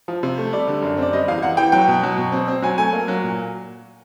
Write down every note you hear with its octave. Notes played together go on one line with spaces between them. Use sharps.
F3
C3
A3
G3 D5
D3
F#2
C4
D5
G3 D#5
E2 F5
E2 F#5
E3 G5
F#3 G5
B2
F#3
B2
C4
C4
F#3 G#5
A3 G#5
A#3
F#3
A#2